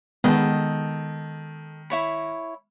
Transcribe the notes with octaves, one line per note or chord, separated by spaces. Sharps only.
D#3 G#3 B3 A4 D#5
E4 C#5 B5